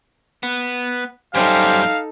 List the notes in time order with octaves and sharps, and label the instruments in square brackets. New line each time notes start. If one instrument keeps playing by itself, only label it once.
[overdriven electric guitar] B3
[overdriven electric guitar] F#2 G3 [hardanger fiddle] D#4 A4 [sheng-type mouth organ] G4 C5 G#5 [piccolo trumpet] F5